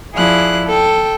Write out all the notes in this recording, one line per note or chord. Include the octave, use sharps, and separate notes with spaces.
F3 E4 G#4 D5 F#6
A4 G5